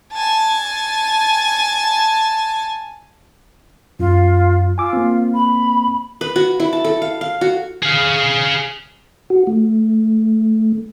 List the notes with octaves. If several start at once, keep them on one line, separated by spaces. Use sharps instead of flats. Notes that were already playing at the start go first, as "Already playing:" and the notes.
G#5 A5
F#2 F4
F4 G#5 D6 E6
A#3 C4
B5
B4
F#4
E4
A5
A4
F5
F5
F#4
G#4 F5
F#4
A3